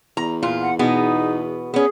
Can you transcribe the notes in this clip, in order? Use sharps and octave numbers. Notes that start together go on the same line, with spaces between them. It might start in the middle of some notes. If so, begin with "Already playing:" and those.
E2 A#5
A#2 F4
F#5
B2 B3 D#4 G#4
B3 C#4 G#4